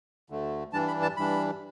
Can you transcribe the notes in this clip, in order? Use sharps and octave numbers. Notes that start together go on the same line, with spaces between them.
D2 D3 A3
G2 E3 G3 D4 A5
B5
A5
G2 E3 G3 D4 B5